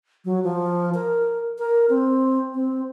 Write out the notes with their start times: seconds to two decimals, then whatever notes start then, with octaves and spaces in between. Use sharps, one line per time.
0.25 F#3
0.44 F3
0.94 A#4
1.59 A#4
1.90 C4
2.55 C4